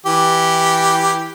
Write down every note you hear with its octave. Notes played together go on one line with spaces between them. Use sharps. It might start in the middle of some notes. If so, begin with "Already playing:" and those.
E3 G4